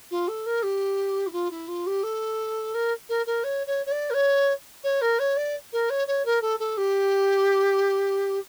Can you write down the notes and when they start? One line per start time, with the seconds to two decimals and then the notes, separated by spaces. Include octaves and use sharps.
0.11 F4
0.28 A4
0.46 A#4
0.63 G4
1.27 E4
1.33 F4
1.51 E4
1.68 F4
1.86 G4
2.03 A4
2.74 A#4
3.09 A#4
3.26 A#4
3.44 C#5
3.67 C#5
3.86 C#5
3.91 D5
4.10 A#4
4.14 C#5
4.84 C#5
5.01 A#4
5.19 C#5
5.37 D5
5.73 A#4
5.90 C#5
6.07 C#5
6.25 A#4
6.42 A4
6.59 A4
6.77 G4